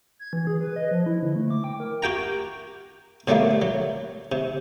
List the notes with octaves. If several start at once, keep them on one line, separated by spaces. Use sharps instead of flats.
G#6
E3
G#4
B4
D#5
F3
E4
D3
A3
D6
G5
A#4
F#4 G4 G5 A#5
B2 F#3 G3 A3 A#3
F#3
C3